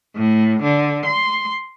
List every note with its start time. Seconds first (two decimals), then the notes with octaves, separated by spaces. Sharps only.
0.15 A2
0.62 D3
1.05 C6